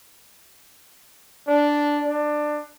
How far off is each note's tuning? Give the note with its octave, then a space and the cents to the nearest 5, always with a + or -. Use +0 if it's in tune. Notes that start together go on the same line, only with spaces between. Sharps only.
D4 -5
D4 +20